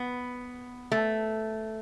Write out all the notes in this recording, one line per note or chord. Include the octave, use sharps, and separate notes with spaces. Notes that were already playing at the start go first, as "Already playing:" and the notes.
Already playing: B3
A3